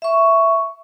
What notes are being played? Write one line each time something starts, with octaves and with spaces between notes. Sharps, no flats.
E5 C#6